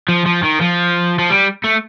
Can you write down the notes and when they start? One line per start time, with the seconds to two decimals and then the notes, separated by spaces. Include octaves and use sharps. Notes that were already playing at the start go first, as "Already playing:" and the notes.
0.09 F3
0.26 F3
0.43 D#3
0.61 F3
1.19 F3
1.30 G3
1.64 A3